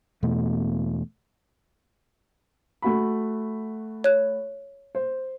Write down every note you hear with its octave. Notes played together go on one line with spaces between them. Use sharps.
E2 B2 A3
A3 F#4 B5
C#5 F#6
C5